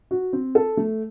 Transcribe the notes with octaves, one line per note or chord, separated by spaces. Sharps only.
F#4
C4
A4
A3